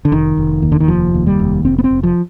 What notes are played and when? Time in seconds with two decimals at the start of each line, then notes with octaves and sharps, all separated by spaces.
0.05 D3
0.12 F1 D#3
0.37 F1
0.62 D#2
0.72 D3
0.80 D#3
0.88 F1 F3
1.14 D#2
1.27 G3
1.40 F1
1.65 F1 C4
1.78 B3
1.84 C4
1.91 F1
2.03 F3